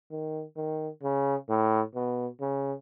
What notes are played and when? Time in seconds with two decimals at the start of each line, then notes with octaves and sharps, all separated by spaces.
0.11 D#3
0.56 D#3
1.03 C#3
1.49 A2
1.95 B2
2.41 C#3